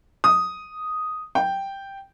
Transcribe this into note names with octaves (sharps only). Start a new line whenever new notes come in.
D#6
G5